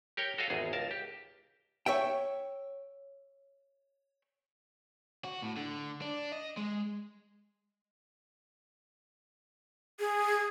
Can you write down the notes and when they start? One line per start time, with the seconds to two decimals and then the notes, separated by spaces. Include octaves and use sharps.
0.17 G4 A#4 C#5 G5
0.38 F#4 A4 C#5 D#5 F5
0.50 G#1 E2 G#4
0.73 C#2 A#4 A5
0.91 G4
1.86 C#5 E5 G5
5.24 F#4
5.42 A2
5.57 D3
6.02 D4
6.32 D#5
6.57 G#3
10.00 G#4